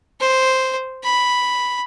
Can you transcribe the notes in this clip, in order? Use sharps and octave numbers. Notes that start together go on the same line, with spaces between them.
C5
B5